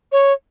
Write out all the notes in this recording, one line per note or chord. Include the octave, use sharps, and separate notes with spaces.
C#5